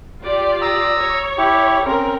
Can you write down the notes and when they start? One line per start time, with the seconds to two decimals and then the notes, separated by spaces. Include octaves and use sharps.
0.22 F4 G4 D5
0.62 A#5 D#6 E6
0.98 C#5
1.38 E4 G4
1.86 C4 C#4 A#4